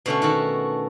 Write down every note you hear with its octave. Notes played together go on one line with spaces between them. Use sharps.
B2 D3 A3 C#4
D#3 F#4 A4